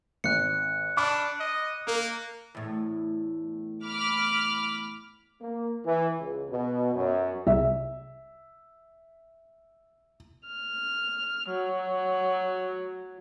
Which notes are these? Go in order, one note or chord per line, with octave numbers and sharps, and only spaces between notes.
G#1 F#6 C#7
D4 B5 D6 F6
D#5
A#3 A#4
E2 A2
B5 D6 F6
A#3
E3
C#2
B2
F#2
C2 E5
F6
F#3